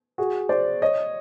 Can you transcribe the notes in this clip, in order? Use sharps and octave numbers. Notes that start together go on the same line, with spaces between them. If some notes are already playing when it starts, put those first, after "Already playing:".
F#4 G#4
C5 D5
C#5 D#5